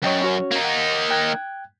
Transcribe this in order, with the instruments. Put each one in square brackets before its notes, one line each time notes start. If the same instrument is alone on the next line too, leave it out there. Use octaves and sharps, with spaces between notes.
[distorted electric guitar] F#2 [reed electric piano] C#5 D#5 G5
[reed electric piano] C#4 F#4 C#5
[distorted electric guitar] A#3 D#4
[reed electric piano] F#5
G5 F#6 G#6